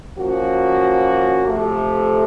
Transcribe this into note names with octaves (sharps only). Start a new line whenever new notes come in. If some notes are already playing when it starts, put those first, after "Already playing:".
F3 A#3 C#4 F#4
C3 F3 A3